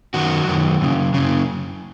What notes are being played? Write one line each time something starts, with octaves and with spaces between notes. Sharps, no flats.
F#2 D#3 F#4
F#2 D#3
F#2 C#3
F#2 C#3